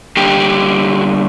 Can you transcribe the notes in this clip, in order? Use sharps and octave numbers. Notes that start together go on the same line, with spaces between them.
D3 G3 A#3 G4